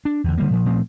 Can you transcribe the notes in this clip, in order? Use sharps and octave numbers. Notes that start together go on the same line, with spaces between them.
D4
E2 D3
D3 G3 A#3
A#2 F3
A#2 F3 A3 C4